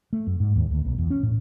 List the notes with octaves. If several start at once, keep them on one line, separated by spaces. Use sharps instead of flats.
A3
F#2
G#2
D#2
D2
B1
E2
C#4
A2